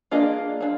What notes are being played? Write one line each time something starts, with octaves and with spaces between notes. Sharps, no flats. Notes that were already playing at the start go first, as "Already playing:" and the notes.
A#3 D4 F4 G#4 D#5
A#3 D4 F4